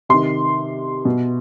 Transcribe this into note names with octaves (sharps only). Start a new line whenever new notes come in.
C3 D#3 C6
B2